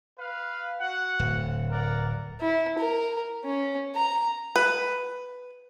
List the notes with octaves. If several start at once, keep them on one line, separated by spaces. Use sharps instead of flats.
B4 F5
F#4 F#5
D1
A#4 D5 F#5
E4
A#4
C#4
A#5
B4